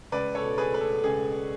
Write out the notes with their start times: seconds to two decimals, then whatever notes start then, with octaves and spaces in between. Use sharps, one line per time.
0.12 C#2 B4 D5
0.35 A4 C#5
0.43 B2
0.58 G#4 B4
0.73 A3 B4
0.81 A4
1.04 C#2 G#4